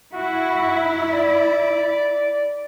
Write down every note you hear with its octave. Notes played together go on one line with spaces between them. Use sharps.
E4 F#4
D5